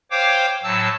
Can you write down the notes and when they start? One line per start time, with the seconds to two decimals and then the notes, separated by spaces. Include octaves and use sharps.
0.11 C5 C#5 F5 G5 D6
0.63 A2 F#3 A5 E6